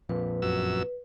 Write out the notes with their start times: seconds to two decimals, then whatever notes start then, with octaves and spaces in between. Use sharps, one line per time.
0.09 A#1 F2 A#2 B4
0.42 F#2 E6